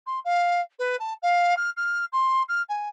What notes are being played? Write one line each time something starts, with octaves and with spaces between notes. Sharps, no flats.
C6
F5
B4
A5
F5
F6
F6
C6
F6
G#5